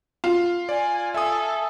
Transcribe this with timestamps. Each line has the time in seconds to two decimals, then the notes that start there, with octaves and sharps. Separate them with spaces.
0.24 F4
0.69 D5 G#5
1.14 A4 E5 G#5 D#6